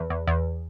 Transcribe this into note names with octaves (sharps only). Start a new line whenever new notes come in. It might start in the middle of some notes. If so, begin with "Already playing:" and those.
Already playing: E2
E2
E2